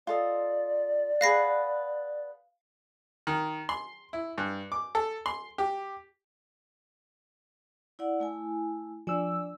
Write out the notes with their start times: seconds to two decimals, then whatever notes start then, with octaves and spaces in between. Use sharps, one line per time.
0.07 F4 A4 D5 D#5
1.21 G#4 B4 F5 F#5 A#6 C7
3.27 D#3
3.69 C6
4.13 E4
4.38 G2
4.72 D6
4.95 A4
5.26 C6
5.58 G4
7.99 E4 D5 F#5
8.20 A3 E4 G#5
9.07 F3 D4 D5 G#5 E6